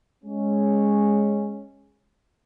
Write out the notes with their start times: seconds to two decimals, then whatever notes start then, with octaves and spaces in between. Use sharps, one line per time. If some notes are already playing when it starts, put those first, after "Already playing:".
0.24 G#3 C#4